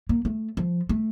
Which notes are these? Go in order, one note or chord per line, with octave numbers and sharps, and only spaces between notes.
A#3
A3
F3
A3